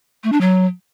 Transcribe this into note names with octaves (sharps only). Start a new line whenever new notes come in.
A3
D4
F#3